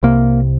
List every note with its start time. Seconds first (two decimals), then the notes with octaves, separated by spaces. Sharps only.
0.03 C2 C3 A#3